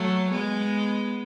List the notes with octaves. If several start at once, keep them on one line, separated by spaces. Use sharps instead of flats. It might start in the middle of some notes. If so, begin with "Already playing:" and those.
Already playing: F#3 A3
G#3 B3